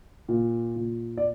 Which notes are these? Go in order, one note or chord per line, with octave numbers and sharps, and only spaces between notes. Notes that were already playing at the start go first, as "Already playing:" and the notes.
A#2
A#2
D5